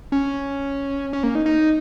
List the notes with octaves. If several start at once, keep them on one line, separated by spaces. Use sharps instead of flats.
C#4
C#4
A#3
D#4
D#4